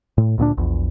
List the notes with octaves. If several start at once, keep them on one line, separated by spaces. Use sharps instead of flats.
A2
D2 A#2 B3 D4
A#1 E2